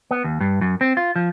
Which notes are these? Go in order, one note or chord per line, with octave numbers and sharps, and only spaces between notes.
B3
D#2
G2
F#2
C4
F4
F3